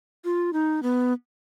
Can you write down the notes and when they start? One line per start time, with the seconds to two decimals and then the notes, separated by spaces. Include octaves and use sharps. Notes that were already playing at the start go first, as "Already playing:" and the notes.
0.24 F4
0.53 D#4
0.83 B3